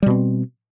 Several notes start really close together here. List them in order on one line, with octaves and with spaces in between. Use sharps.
G3 B2 C4